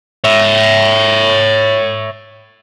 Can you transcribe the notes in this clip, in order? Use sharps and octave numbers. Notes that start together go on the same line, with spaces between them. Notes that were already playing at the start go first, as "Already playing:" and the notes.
C#5 E5